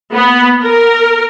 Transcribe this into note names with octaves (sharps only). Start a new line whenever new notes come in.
B3
A#4